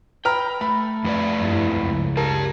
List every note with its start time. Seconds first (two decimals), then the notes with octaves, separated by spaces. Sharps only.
0.25 B4 G5 A#5 F6
0.61 A3 B5
1.04 F2 B4 D5
1.38 G2 E4
1.80 C#2
2.17 G4 A#4 A5